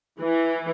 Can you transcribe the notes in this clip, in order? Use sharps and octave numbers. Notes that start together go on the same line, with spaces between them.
E3